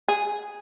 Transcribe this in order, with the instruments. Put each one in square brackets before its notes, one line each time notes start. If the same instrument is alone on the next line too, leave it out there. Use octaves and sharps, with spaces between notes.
[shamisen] G#4